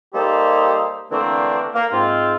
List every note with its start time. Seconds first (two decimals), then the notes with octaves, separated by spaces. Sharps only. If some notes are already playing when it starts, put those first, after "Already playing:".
0.14 G3 A#3 D#4 G4 A4 C5
1.11 D3 E3 A3 A#3 C4 D4
1.74 A#3
1.92 G#2 C4 F4